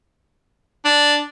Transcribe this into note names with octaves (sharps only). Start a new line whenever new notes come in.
D4